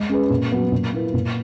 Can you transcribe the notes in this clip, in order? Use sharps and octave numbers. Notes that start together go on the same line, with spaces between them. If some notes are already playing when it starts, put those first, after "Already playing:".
Already playing: G#3
C#4 G#4 B4
A#2
F#3 B3 F#4
A#2
A#3 E4 B4
A#2